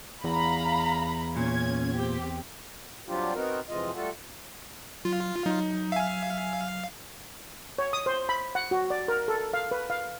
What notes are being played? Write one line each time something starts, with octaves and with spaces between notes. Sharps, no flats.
E2 F5 A#5 B5
A#2 C#4 G#6
C4 G4
F#3 G3 C4 D4 F4 G4
B3 C4 D#4 F#4 A#4
F2 C3 E3 G#3 F4 D#5
G3 A3 F4 F#4 A4
F#3 F4
F#3 D#4
E5 F5 G#5
C#5
D#6
C5
B5
F#5
F#4
D5
A#4
A4
F5
B4
F5